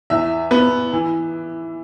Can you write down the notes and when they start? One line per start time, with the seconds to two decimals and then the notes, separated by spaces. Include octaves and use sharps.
0.10 E2 E5
0.51 B3
0.92 E3